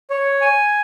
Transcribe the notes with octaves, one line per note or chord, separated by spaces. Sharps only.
C#5
G#5